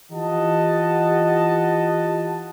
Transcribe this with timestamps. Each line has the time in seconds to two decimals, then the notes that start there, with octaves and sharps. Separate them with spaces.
0.12 E3 F4 G4 D#5 F#5 A5